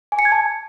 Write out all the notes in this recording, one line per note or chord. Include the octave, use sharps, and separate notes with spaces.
G#5
C#7
G#6
A5